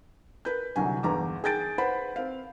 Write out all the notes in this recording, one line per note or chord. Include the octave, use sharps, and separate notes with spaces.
A#4 B4 G6
C2 D3 F#3 G#5
G1 E2 A#5 D6
G#4 G5 G6 A6 D7
B4 C5 F#5 B5
C4 F5